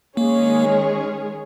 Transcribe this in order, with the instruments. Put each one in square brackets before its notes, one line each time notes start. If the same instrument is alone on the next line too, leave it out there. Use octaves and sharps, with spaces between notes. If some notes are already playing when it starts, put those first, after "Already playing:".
[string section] D#3 G#3 C#4 G#4 C#5 [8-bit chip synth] A#3